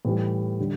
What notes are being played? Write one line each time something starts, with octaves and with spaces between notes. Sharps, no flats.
A2 E3 G3
D3 G3